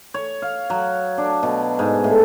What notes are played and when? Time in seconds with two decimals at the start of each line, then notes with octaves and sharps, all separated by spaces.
0.14 C#5
0.42 F5
0.70 F#3
1.18 D4
1.43 B2
1.79 G#2
2.04 A2